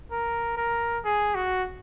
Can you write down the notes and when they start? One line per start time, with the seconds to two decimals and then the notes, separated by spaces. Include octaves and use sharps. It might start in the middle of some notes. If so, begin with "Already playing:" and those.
0.12 A#4
0.57 A#4
1.05 G#4
1.35 F#4